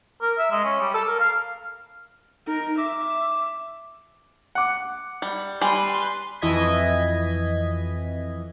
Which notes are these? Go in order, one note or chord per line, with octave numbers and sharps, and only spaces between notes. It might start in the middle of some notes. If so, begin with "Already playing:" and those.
A#4
E5
G#3
C#4
G3
A4
A#4
F5
D#4 A#4
E5 D6
F#5 D6
G3
G3 B4 G#5 C6
F2 E3 D#5 G#6 B6